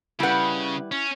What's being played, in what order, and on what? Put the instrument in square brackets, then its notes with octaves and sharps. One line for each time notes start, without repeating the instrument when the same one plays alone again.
[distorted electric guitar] C#3 [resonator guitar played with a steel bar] G3 B4 [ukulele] E4 F#5
[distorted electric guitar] C#4